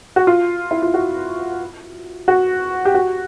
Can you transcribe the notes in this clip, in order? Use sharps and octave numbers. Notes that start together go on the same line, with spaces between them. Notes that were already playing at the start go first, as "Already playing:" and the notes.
F#4
F4
E4
F4
F#4
F#4
G4
F#4